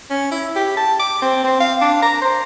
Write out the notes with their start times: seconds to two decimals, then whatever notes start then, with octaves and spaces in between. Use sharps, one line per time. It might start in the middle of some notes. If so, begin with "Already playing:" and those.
0.10 C#4
0.31 E4
0.56 G4
0.77 A5
1.00 D6
1.22 C4
1.44 C4
1.60 F5
1.81 D4
2.02 A#5
2.22 C5